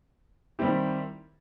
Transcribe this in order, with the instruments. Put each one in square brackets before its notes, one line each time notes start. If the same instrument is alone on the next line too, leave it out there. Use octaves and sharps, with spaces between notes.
[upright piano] D#3 G3 C4 E4 G4